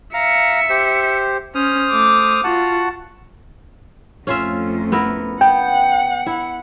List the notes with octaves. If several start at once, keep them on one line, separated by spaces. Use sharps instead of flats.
E5 F5 A#5 C#7
G4 C5
C#4 C5 D#6 F6
A3 D6
F4 F#4 F#5 A5
F2 A3 C#4 F4 E5
B3 E4 A#4
B3 F#5 G5
E4